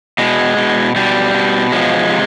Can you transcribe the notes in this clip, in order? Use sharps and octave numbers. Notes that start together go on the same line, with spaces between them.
B2 G#3
B2
B2 G3
B2
F3 G#3
C3